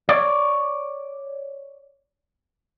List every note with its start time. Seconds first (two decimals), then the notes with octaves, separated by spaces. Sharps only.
0.09 C#5 D5